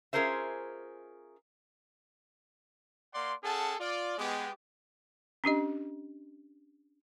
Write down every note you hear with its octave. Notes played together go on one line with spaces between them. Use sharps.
C#4 F4 G#4 A#4 C5 E5
A#3 D5 F#5 C6
C#4 G#4 A4 F#5 G5 A5
F4 D5
G#3 B3 G4
C#4 D4 G4 D#5